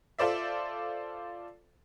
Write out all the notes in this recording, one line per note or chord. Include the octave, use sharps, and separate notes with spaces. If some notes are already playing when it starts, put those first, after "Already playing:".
F4 A4 C5 D5 E5